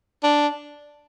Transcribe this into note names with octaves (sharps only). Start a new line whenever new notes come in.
D4